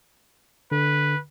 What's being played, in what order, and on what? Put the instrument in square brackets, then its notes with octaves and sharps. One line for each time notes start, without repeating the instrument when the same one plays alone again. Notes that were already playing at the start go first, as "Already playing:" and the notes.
[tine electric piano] D3 [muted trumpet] B4